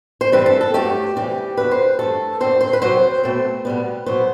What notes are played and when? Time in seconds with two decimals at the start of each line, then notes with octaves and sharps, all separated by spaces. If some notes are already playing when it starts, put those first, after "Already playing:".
0.21 C5
0.32 G2 E3 G3 C4 B4
0.46 A4
0.61 A4
0.74 G2 F#3 A3 G4
1.16 C3 E3 G3 G4
1.57 E2 D3 F#3 B3 B4
1.71 C5
1.99 G2 E3 A3 A4
2.40 F#2 D3 F#3 C4 C5
2.61 C5
2.73 B4
2.82 C3 F#3 C4 C5
3.24 B2 A3 C4
3.65 B2 G3 B3
4.06 B2 F#3 B3 C5